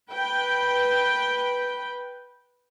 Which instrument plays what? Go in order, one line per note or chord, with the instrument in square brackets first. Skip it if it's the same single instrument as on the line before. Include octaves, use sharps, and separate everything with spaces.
[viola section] B4 G5